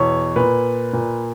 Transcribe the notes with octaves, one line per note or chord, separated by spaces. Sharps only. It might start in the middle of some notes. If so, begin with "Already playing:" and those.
Already playing: E2 B2 C#5
A#2 B4
A#2